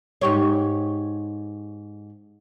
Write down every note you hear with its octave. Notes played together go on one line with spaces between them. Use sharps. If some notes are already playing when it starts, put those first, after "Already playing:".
G#2 G4 C#5